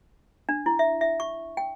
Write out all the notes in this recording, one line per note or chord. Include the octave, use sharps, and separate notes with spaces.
D4
E4
E5
E5
C#6
G5